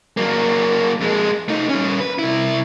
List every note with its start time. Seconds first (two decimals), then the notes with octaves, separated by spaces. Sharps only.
0.17 F#3 A#3
1.01 F2 G#3
1.48 A3 D#4
1.69 G3 C#4
2.00 B4
2.19 C3 E4